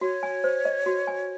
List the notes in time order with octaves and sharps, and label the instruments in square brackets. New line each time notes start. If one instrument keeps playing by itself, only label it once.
[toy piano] F#4 [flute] C#5
[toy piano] G#5
C5
D#5
F#4
G#5